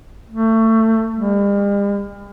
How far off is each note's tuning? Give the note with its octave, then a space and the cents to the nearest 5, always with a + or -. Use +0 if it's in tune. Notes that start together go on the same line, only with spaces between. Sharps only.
A3 +25
G3 +45